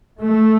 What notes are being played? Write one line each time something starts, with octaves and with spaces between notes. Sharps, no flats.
A3